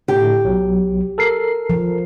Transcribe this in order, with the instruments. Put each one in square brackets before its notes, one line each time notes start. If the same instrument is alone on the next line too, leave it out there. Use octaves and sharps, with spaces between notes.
[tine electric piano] A2 D3 [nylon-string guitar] G4
[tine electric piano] B1 F#3
A4 A#4 C7
[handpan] F3